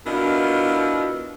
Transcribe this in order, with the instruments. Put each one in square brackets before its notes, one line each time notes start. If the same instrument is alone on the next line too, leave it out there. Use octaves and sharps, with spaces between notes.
[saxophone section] B2 D4 E4 F4 A#4 D#5